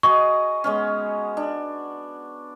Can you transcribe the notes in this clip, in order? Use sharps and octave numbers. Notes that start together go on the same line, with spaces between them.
F#4 G#4 D#5 C#6
G#3 B3 C#4
D4